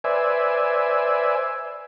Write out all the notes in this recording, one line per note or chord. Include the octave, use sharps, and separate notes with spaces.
B4 C5 D5 E5 G#5